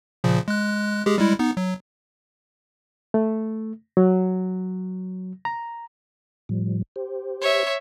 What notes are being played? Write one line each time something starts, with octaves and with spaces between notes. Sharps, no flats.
A#2 C#3 F3
G#3 F#6
G#3 G4 G#4
G3 G#3 E4
B3 D#4
F#3
A3
F#3
A#5
A2 F3 G3
G4 C5
C#5 E5